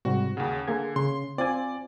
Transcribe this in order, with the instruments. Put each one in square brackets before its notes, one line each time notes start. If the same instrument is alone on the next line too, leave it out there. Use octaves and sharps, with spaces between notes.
[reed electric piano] G#2 C3 G3 [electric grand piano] F#4
[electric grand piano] D#2 C#3 [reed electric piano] F#5
[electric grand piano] D3 [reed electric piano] A#3 G#4 G#6
[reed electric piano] C#3 [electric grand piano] C6
[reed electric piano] C4 F4 G#5 [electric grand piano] D5